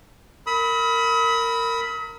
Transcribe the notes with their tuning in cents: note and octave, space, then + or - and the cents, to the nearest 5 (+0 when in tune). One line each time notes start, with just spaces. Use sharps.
A#4 -20 B5 +0 D#6 +45